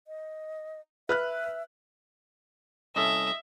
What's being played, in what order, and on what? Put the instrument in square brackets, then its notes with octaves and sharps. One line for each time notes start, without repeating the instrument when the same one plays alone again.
[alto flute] D#5
[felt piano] B4 F6 F#6 [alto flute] E5
[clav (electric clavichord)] C2 C#4 A4 [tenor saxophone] D#5 [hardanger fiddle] E5